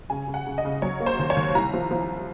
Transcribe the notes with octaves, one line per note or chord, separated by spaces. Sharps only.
C#3 G#5
C#3
F#5
C#3
D#5
C#3
F#3 C#5
A#3
C5
D#2
C#5
D#2
C2 A#5
F3
F3